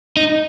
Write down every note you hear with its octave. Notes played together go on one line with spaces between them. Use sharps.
D#4